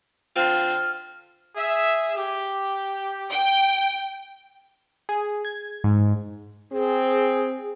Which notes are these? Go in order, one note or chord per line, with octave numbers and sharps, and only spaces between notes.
D3 C4 F4 F6
G#4 E5
G4
G5
G#4
G#6
G#2
C4 G#4